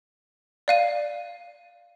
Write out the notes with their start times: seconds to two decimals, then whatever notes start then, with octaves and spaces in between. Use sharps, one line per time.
0.68 D5 F5 D#7